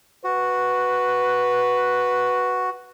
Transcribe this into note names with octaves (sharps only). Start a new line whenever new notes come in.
F#4 B4